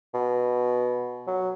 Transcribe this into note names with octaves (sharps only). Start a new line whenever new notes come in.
B2
F#3